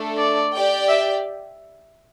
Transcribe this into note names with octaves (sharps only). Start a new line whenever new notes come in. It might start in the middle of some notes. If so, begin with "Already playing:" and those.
Already playing: A3 D4 A4
D5
G4 D5 G5
E5